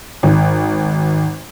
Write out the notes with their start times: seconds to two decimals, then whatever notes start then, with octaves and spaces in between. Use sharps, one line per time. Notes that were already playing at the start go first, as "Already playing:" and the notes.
0.23 G#1